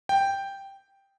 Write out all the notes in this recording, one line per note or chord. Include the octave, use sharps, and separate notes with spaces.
G5